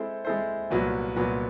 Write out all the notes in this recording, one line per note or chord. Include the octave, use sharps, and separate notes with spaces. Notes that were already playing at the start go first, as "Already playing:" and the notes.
Already playing: G#3 C4 E4 A4 C5
G#3 C4 E4 A4 C5
C2 A#2 F#3 B3
C2 A#2 F#3 B3